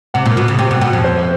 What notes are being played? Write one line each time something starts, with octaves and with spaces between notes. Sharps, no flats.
C3 F#5
A#2
B2
C#3
C3 G5
B2
B2 F#5
F2
C5